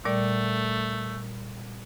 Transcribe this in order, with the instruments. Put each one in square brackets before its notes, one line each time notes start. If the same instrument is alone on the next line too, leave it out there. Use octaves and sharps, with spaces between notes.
[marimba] A#2 G3 D5 [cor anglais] A3